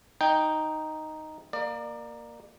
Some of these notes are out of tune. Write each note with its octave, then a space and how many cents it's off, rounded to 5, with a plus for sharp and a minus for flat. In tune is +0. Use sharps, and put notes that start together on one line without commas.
D#4 +0 G5 +0
A#3 +0 D5 +30